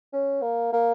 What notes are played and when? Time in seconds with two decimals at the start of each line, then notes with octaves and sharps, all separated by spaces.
0.13 C#4
0.42 A#3
0.73 A#3